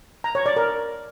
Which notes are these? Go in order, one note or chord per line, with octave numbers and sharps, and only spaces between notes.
A#5
C#5
D5
A#4